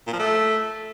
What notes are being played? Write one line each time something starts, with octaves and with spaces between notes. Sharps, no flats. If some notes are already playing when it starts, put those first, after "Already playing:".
A#2
F3
A3